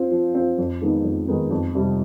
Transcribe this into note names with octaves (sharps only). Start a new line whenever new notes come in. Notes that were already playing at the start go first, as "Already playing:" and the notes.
Already playing: C4 F4
F3
C4 F4
F2
D#3 G#3 B3 D#4
F2
D#3 G#3 B3 D#4
F2
C3 G3